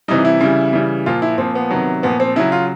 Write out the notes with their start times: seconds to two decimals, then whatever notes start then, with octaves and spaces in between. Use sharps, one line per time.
0.08 C3 E3 G3 D#4
0.25 E4
0.40 C#3 E3 G3
0.73 C#3 E3 G3
1.06 A#2 F3 F4
1.22 E4
1.38 A#2 F3 C4
1.55 B3
1.71 C3 D#3 F#3
2.03 A#2 F3 B3
2.20 C4
2.36 C#3 F#3 E4
2.52 F4